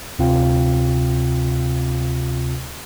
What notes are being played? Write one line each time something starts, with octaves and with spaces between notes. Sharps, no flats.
D2 C3 C4 F4 F5 G5